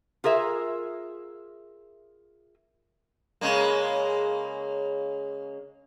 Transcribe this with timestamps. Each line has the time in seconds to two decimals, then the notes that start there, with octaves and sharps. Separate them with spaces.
0.24 F4 G#4 A#4 E5
3.41 C#3 G#3 A#3